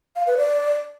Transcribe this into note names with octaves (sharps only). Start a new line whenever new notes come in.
F5
B4
D5